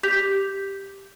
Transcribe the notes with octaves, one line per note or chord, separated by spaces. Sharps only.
G4 G6 B6 F7